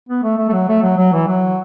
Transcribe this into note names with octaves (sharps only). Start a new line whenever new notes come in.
B3
A3
A3
A3
F#3
A3
F#3
F#3
E3
F#3